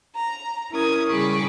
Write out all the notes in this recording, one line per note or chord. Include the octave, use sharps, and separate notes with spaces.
A#5
C#4 E4 A#4 D#6 G#6
C#3 G3 G#4 B5 C#6 D6